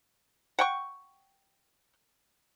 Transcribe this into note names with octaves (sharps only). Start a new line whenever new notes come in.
F#5 G5 C#6